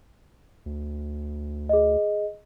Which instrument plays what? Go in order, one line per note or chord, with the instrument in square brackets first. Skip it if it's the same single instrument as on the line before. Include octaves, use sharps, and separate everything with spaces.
[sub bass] D2
[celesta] G#4 D#5